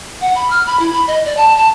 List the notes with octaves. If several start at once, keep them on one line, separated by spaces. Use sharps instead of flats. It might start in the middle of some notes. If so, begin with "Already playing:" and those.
F#5
B5
F6
B5
E4
B5
D#5
D5
A5
A5